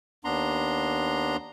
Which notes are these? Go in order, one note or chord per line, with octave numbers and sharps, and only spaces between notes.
D#2 B3 D4 A#5 C6